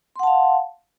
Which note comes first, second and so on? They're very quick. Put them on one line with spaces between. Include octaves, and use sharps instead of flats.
C6 F#5 A5 F5